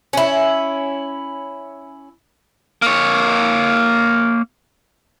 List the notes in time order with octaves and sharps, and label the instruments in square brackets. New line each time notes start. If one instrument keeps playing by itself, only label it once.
[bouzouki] C#4 E4
[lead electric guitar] A#3 C#5